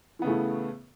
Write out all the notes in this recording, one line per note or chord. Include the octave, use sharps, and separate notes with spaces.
A2 C#3 E3 A3 B3